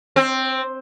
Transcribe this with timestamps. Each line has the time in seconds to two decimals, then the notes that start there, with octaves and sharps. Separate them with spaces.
0.16 C4